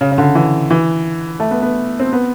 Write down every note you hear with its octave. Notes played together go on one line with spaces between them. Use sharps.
C#3
C#3
D3
E3
E3
A3
B3
B3
C4
B3